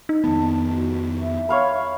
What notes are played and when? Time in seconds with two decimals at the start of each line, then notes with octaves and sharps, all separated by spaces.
0.09 D#4
0.24 F2 D#3 B3 A5
0.69 F#4
1.20 E5
1.49 C#5 F5 B5